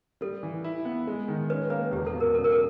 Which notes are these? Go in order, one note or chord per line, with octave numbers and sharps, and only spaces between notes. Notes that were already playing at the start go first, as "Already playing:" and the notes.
G3 A4
E3
E4
B3
G#3
D#3
C#4 B4
A#3 B4
E1 G4
A4
B2
A#4
C#3 A4
A#4
A4